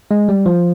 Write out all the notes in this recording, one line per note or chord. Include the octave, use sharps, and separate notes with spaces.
G#3
G3
F3